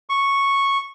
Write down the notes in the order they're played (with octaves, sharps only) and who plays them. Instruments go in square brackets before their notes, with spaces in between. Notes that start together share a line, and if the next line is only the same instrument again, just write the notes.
[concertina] C#6